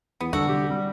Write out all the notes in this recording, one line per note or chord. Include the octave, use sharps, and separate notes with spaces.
E2 B3
E2 D3 G3 F#4 A4
C3 G3 G4
G3 C4